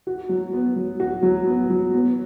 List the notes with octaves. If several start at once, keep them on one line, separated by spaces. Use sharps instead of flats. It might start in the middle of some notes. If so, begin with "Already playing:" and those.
F#4
F#3
B3
F#3
F#4
F#3
B3
F#3
B3